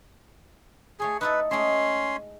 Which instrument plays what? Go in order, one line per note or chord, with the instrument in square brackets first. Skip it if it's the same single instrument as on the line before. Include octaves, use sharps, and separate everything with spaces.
[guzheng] A3 C#5 C6 [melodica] G#4
[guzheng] D#4 E4 A4 [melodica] B4
[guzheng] G#3 A3 [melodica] C#4 C6